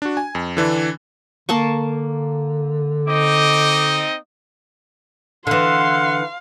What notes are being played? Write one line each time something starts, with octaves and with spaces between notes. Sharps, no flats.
D4 F#4
G#5
F2
D3 E3 D4
D3 A#3 A5 C#6
C4 D#4 D#5 D6
D3 E3 F5 F#5 C6